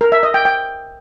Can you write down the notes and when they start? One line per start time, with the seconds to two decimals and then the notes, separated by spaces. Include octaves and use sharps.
0.01 A#4
0.12 E5
0.23 D#5
0.34 G5
0.45 G5